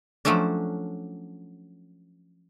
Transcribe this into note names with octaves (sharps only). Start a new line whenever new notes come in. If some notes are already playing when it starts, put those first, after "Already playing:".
F3 F#3 A3 C#4 D4